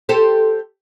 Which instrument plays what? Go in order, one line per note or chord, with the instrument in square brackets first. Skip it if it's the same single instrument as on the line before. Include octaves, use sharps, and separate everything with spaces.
[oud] G4 A4 C5